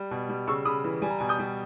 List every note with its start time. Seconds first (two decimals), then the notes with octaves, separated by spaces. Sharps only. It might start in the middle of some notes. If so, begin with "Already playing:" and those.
Already playing: G3
0.11 B2
0.29 G3
0.47 C#3 C#6 E6
0.65 C#3 B5 D#6
0.84 E3
1.02 G3 G#5
1.10 A#5
1.19 B2 G#5
1.29 D#6 G6
1.39 G3